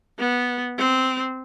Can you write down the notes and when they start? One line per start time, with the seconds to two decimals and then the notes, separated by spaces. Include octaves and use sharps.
0.19 B3
0.78 C4